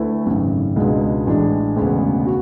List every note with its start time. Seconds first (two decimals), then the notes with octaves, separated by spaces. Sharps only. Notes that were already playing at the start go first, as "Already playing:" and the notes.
Already playing: D2 A3 E4 B4
0.26 G#1 F#2 C#3
0.76 C#2 B2 G#3 B3 D4
1.26 A1 A2 E3 G#3 D4
1.76 E1 D2 C#3 G#3 B3
2.26 F#4